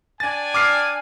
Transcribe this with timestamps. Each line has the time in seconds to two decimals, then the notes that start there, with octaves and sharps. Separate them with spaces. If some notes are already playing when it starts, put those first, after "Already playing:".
0.20 D4 G5 G#5 A6
0.54 D6 F6 C7